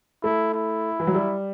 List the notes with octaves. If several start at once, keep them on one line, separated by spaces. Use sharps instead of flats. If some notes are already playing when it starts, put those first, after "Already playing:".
A3 E4
E4
E3
F#3
G3